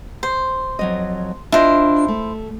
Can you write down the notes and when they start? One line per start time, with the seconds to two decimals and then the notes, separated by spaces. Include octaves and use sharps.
0.23 C5
0.79 F2 F#3 D#5
1.52 D4 E4 F4 C5 D#5
2.08 A3